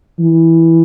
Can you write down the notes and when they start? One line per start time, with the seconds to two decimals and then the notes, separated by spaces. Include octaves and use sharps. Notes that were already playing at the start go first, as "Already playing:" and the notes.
0.19 E3